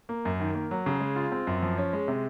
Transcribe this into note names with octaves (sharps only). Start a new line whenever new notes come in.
A#3
F#2
D#3
A#3
F#3
C#3
G#3
F4
C4
F#2
F3
C#4
G#3
C3